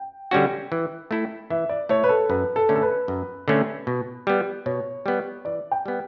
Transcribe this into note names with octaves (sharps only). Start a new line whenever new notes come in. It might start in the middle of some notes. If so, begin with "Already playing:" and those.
Already playing: G5
D3 G3 C#4 F#4
E3
A3 E4 A4
E3 E5
D5
A3 E4 A4 C#5
B4
A4
F#2 B4
A4
D3 A3 C#4
A4
B4
F#2
D3 A3 C#4
B2
G3 B3
B2 C#5
G3 B3
E3 D5
G5
G3 B3